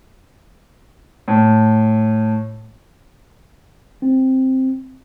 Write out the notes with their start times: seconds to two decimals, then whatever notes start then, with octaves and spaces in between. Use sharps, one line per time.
1.28 A2
4.02 C4